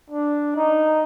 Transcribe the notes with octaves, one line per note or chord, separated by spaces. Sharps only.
D4
D#4